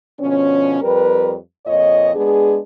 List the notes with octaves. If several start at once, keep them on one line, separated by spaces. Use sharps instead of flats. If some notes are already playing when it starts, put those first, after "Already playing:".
B2 D3 F3 C#4
F2 G3 A#4 B4
F2 A#2 C#5 D#5
G#3 B3 D4 G#4